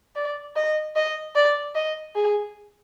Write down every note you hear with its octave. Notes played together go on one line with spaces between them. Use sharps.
D5
D#5
D#5
D5
D#5
G#4